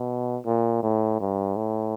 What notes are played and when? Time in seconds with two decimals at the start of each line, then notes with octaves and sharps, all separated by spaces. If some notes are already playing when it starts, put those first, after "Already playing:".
Already playing: B2
0.46 A#2
0.83 A2
1.20 G2
1.56 A2